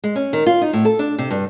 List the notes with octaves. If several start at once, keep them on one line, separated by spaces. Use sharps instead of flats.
G#3
C#4
D#3
F4
D#4
A2
A4
D4
C3
G2